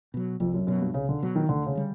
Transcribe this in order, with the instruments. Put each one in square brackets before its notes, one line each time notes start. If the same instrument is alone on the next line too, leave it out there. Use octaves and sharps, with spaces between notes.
[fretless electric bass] B2 F#3
[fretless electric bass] C2 [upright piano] F2
[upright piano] F#2
[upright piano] F#2 [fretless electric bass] B2 F#3
[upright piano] G2
[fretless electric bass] C2 [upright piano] C#3
[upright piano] D3
[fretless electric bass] B2 F#3
[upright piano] D#3
[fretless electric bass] D2 [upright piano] D3
[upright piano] C#3
[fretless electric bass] D3 G3